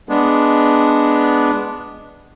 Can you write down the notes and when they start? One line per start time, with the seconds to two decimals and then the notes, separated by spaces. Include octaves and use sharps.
0.09 G#3 B3 D4